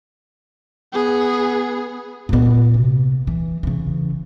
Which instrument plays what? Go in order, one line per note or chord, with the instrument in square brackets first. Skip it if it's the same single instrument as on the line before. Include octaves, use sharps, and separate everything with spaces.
[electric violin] B3 G#4
[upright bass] A#2 B3
C3
E3
C#3 E3